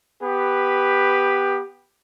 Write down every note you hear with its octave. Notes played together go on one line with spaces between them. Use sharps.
B3 G4 B4